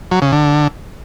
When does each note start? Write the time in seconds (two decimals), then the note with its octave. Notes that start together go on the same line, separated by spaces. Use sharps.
0.11 F#3
0.22 C#3
0.32 D3